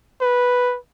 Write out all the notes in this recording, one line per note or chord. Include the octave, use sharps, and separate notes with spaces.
B4